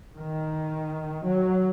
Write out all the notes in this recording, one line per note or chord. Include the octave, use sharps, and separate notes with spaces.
D#3
F#3